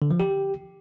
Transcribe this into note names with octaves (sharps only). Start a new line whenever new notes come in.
D3
F3
G4